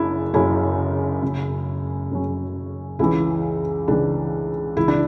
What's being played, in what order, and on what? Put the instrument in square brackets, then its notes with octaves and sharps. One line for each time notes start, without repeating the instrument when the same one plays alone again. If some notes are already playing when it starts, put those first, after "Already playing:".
Already playing: [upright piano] F#1 F#2 C#3 [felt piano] D4 E4
[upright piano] F#1 F#2 C#3 F#3 C#4 [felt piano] E4
[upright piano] F#1 F#2 C#3 F#3 C#4
F#1 F#2 C#3 F#3 C#4
[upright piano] C#2 C#3 E3 [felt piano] E4
[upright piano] C#2 C#3 E3 [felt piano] D4
[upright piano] C#2 C#3 E3 [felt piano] E4
[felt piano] D4